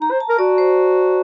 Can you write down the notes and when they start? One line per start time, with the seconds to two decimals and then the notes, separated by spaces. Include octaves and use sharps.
0.01 D#4 A#5
0.11 C5
0.20 A5
0.29 A#4
0.39 F#4 D5
0.58 C5